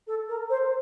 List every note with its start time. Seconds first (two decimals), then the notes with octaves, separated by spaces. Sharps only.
0.07 A4
0.28 A#4
0.50 C5